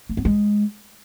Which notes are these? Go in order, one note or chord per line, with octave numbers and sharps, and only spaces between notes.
A#3
B3
G#3